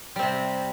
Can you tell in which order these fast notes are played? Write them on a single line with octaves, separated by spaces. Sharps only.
G3 C4 C3